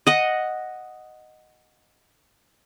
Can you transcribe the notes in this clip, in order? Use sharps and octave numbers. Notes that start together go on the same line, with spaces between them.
D#5 F#5